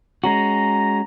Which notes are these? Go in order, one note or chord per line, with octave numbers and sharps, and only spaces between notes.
G#3 C#4 F#4 A#5